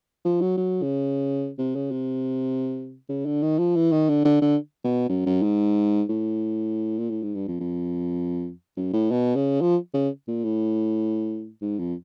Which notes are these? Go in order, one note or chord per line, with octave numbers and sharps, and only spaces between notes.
F3
F#3
F#3
C#3
C3
C#3
C3
C#3
D3
D#3
F3
E3
D#3
D3
D3
D3
B2
F#2
F#2
G#2
A2
A#2
A2
G#2
G2
F2
F2
F#2
A2
B2
C#3
F3
C#3
A#2
A2
G#2
F2